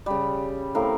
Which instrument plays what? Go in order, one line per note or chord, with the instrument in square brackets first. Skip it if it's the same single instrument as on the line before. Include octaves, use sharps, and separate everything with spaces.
[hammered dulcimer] C#3 G3
A2 C4 A#4 F5